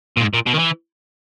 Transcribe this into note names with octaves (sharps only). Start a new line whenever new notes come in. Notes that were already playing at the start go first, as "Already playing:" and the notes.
A#2
G#2
A#2
B2
D#3
E3